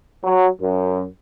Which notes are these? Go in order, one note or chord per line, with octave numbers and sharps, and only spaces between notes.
F#3
F#2